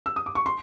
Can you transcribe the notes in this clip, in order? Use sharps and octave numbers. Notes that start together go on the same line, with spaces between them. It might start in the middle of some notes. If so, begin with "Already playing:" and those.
E6
D#6
D6
C#6
C6